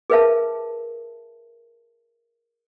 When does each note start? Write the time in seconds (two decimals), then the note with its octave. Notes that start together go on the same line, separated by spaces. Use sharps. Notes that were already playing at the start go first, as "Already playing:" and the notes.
0.10 G#4 A#4 B4 E5 F5 A5